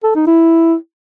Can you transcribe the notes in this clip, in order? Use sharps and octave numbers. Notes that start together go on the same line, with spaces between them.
A4
D#4
E4